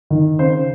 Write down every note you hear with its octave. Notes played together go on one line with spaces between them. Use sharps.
D#3
C#3 C5